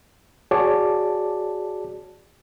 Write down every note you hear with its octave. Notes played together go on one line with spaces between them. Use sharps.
F#4 G#4 C#5 D5 A5 D6